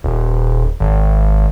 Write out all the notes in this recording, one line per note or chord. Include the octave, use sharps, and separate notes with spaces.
D#1
G#1